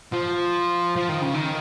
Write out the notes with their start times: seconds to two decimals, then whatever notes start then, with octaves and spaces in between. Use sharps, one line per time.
0.12 F3
0.96 F3
1.09 D#3
1.21 C#3
1.34 D#3